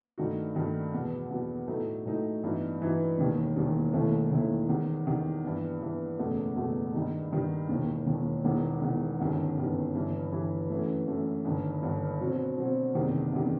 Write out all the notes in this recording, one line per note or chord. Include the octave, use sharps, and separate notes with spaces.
G2 D#3 A3 D#4 F#4
G2 D#3 A3 D#4 F#4
E2 B2 F#3 B3
E2 B2 F#3 B3
A2 F#3 A3 D#4
A2 F#3 A3 D#4
G2 E3 B3 D#4 F#4
G2 E3 B3 D#4 F#4
E1 D#2 D#3 G3
E1 D#2 D#3 G3
E1 D#2 D#3 A3 E4
E1 D#2 D#3 A3 E4
E2 D#3 G3
E2 D#3 G3
G2 E3 B3
G2 E3 B3
F#1 E2 B2 A3
F#1 E2 B2 A3
G2 D#3 G3 D#4
G2 D#3 G3 D#4
E1 D#2 D#3
E1 D#2 D#3
E1 E2 D#3
E1 E2 D#3
G1 F#2 D#3 G3 B3
G1 F#2 D#3 G3 B3
G1 G2 E3 G3
G1 G2 E3 G3
F#2 E3 A3
F#2 E3 A3
G1 G2 D#3
G1 G2 D#3
B2 F#3 C4 F#4
B2 F#3 C4 F#4
F#1 E2 C3 D#3 G3
F#1 E2 C3 D#3 G3